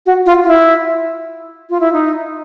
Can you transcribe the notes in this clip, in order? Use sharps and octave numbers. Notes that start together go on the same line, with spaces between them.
F#4
F4
F4
E4
F4
E4
D#4